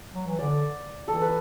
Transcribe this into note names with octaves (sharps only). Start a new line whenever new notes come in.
F#3
E3
D3 D5
E3 A4
B4